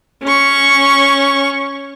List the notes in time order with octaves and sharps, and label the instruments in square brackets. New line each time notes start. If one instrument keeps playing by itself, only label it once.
[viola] C#4 C#6